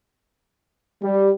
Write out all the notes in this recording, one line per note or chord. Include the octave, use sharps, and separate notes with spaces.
G3